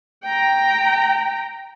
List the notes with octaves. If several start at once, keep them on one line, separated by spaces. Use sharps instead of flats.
G5 A#5